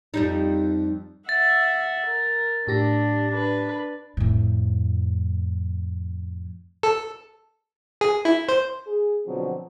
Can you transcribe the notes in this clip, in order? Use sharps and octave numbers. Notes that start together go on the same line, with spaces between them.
F2 G3 D#4
E5 F#5 A6
A#4
A2 D4 G4 A#6
D4 B4
F2 A2
A4
G#4
E4
C5
G#4
B2 D3 F3 F#3 C4